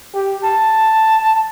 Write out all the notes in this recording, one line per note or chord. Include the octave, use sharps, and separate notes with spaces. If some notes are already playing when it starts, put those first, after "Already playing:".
G4
A5